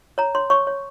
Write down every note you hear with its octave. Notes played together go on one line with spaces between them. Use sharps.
C#5 A#5
C#5 C6
C#5 C#6
C#5